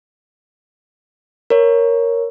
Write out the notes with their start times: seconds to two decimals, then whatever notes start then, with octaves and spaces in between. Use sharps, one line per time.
1.50 A#4 C#5